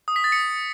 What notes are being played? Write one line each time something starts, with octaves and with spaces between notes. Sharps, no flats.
D#6
B6
A6
C#7